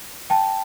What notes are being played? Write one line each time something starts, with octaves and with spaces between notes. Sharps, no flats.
G5 A5